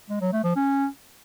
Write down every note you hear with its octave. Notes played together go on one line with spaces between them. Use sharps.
G#3
F#3
A3
F3
C#4